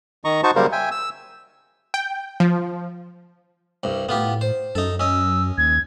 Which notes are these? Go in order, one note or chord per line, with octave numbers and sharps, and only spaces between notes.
D#3 D#5 A#5 C#6
D#4 F#4 C5 A5 C#6
C#3 F#3 G3 A#3 A#4 C5
E5 G5 G#5
E6
G5
F3
C2 G2
A2 B3 F4 G4
C5
F#2 D#4 A4
C#4 D#5 E6
D#2 G#6